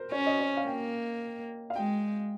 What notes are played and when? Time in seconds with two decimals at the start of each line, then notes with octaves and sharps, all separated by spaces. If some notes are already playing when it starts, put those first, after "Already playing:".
Already playing: A#4 C5
0.12 C#4 C#5
0.26 D#5
0.40 C#5
0.57 F5
0.67 A#3 G5
1.70 F5
1.76 G#3 G5